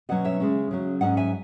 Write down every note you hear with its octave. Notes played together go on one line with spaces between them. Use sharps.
B2 F#3 C#4 D#5 F#5
C#5 E5
C#3 G#3 C#4
C#3 F#3 C#4
G#2 F#3 C#4 D#5 F#5
E5 G#5